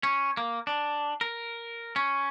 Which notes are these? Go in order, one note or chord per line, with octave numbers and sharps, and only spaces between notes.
C#4
A#3
D4
A#4
C#4